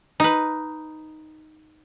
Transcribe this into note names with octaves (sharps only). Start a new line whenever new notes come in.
D#4 B4